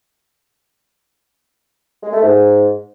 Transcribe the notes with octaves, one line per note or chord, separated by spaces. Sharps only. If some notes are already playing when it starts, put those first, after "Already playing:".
G#3
A3
G#2